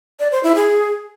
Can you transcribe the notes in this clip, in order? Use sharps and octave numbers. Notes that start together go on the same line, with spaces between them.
D5
C5
E4
G#4